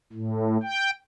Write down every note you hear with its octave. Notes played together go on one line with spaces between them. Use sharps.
A2
G5